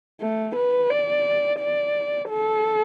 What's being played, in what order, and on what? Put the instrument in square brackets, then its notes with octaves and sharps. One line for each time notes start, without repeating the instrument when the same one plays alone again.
[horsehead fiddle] A3
B4
D5
D5
A4